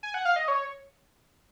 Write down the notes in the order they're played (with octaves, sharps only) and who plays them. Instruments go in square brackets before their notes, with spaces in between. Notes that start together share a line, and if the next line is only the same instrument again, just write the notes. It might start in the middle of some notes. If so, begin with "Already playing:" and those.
[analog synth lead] G#5
F#5
F5
D#5
C#5